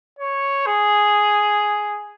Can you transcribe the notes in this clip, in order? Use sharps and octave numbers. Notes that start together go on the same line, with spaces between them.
C#5
G#4